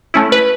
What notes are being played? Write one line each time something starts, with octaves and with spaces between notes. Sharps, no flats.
A3 C#4 E4
B4